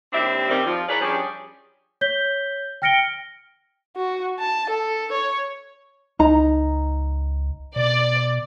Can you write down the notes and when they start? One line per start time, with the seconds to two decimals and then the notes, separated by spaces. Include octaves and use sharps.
0.13 D#2 G3 C4 D4 E5
0.49 D#3 G3 C4
0.65 F3 F4
0.88 E4 G#4 A#4 B4 C#5 D5
1.00 F3 G3 C#4 D4 G4 G#4
2.01 C#5 G6 B6 G7
2.82 G5 F6 A#6 C#7 D7 G7
3.97 F#4
4.39 A5
4.69 A4
5.12 C#5
6.19 C#2 D#4 A#5
7.76 B2 D5